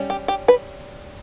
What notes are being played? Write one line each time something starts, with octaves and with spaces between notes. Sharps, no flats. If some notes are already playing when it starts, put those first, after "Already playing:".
Already playing: G3 C#4
G4
G4
B4